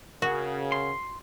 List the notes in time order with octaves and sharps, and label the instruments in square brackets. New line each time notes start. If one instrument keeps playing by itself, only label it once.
[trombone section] C#3 [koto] F#4 [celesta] A#4 F#5
[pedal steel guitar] C6